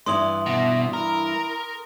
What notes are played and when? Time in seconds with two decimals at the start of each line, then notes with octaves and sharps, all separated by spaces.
0.06 G2 E3 E5 C6 D#6 F#7
0.46 B2 E5
0.94 E4 A#4